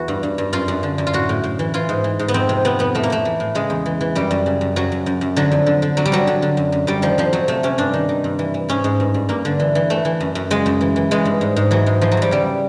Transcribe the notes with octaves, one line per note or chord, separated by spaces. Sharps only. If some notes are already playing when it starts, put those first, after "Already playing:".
Already playing: E2 E3 F#4
G2
G2
G2
F#2 F4
F#2
D3
F#2
F4
A2 F#4
A2
A2
E3
E3 F4
G#2
E3
G#2
B3
F2 C4
C3
C3 B3
F2 B3
A2 A3
A#3
A2 A3
E3
A2
C#3 G#3
E2
E3
E3
F#2 G3
F#2
C#3
F#2
F#2 F#3
F#2
F#2
F#2
D3 F#3
F2
D3
D3
D3 F#3
G3
D3 F#3
D3
D3
F#2
F#2
F#2 G3
D#3 F3
F2 F3
F2 F#3
C3 A3
C3 C#4
G2 D4
D#3
D#3
G2
E3
E3
G#2 C#4
G#2
G2
G2
G2 A#3
D3
E3
E3
E3 A3
E3
F#2
F#2
C#3 G#3
F#2
E3
E3
E3 G#3
G2
G#2
G#2
E3 F#3
G#2
E3 F3
F#3
E2 G3
C#3 G3